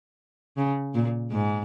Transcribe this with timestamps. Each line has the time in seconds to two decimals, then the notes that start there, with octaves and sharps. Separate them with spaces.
0.57 C#3
0.94 A#2
1.32 G#2